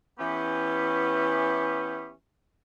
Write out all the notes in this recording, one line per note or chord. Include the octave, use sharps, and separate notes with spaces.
E3 B3 C#4 G4